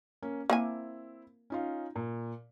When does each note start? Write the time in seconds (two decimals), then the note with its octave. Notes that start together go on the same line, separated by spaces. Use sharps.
0.22 A#3 C#4
0.50 A#3 C4 E4 E5 G#5
1.50 C#4 D#4 F4
1.96 A#2